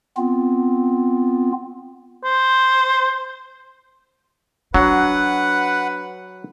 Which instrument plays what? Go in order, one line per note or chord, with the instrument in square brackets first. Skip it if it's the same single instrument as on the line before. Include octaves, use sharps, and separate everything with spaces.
[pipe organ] B3 C4 F4
[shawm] C5
[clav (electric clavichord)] F#3 [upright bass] D4 [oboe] B4 [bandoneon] F#5